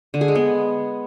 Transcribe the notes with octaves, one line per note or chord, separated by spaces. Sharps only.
D3
G#4
G#3
B3